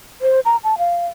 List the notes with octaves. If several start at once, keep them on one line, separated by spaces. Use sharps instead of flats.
C5
A#5
A5
F5